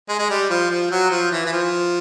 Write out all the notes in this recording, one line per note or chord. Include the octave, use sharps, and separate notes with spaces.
G#3
G#3
G3
F3
F3
F#3
F3
E3
E3
F3